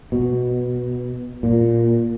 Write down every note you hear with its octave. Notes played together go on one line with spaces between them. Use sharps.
B2
A#2